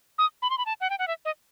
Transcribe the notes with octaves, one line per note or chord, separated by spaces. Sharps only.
D#6
B5
C6
B5
A5
F#5
G5
F#5
E5
D#5